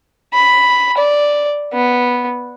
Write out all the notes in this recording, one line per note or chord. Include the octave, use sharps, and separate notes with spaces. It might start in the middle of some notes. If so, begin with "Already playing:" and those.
B5
D5
B3